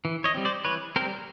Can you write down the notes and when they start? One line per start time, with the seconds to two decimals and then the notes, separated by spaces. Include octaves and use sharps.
0.05 E3
0.24 C#5 D#5
0.34 G3 C4
0.45 C5 D5
0.65 E3 B4 C#5
0.96 G3 C4 A#4 C5